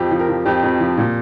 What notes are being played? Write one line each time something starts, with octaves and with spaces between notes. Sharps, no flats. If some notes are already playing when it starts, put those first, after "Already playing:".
Already playing: F2 F3 G4
F3
A#4
F3
F2 G4
F2
F3
A#2